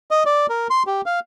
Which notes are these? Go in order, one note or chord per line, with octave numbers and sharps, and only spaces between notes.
D#5
D5
A#4
C6
G4
F5